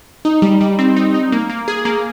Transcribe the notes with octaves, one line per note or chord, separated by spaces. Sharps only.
D#4
G3
G3
C4
D#4
D#4
A#3
A#3
G#4
A#3